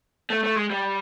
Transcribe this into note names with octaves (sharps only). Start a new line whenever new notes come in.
A3
A3
G#3
G3